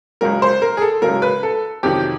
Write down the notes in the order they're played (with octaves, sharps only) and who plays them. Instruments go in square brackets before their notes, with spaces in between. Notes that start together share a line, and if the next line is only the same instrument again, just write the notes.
[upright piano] C#2 C#3 F#3 A#4
C5
A#4
G#4
A4
C#2 C#3 F#3 A#4
B4
A4
F2 C3 D#3 F#3 G4